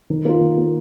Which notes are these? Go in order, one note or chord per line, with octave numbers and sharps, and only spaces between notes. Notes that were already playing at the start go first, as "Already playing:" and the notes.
D#3
A#3 F4
D#3
A#3 F4